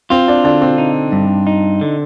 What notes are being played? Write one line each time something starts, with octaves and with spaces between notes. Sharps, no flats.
C4 F4
D4
D3 D4
C4
D#4
G2
D#4
D3